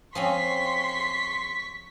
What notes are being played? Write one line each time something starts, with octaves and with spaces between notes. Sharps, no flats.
F3 C4 C#4 C6 C#6 B6